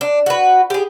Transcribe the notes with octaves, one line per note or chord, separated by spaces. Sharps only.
D4
F#4 B4
G4 G#4